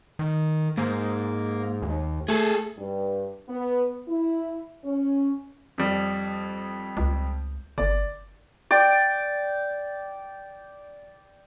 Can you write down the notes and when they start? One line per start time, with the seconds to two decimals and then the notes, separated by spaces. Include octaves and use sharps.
0.19 D#3
0.78 G#2 A#3
1.82 D#2
2.28 A3 G#4 A4
2.78 G2
3.49 B3
4.08 E4
4.85 C#4
5.78 F2 G3
6.97 C#2
7.78 G1 D5
8.71 D5 G5